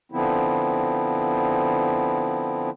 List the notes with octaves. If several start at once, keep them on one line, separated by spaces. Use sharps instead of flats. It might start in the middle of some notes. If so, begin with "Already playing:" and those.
D3 F3 B3 C4 E4